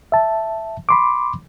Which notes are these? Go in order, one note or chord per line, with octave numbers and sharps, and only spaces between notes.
E5 A5
B5 C6 D6